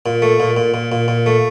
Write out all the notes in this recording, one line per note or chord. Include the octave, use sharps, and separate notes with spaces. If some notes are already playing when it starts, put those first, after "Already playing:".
A#2
A3
A#2
A#2
A#2
A#2
A#2
A3